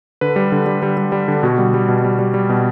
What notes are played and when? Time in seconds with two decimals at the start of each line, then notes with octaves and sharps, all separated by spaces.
0.21 D3 B4
0.36 G3
0.52 D3
0.66 G3
0.82 G3
0.97 G3
1.12 G3
1.28 D3
1.43 B2 F#4
1.58 G3
1.74 G3
1.89 B2
2.04 G3
2.19 G3
2.34 G3
2.49 B2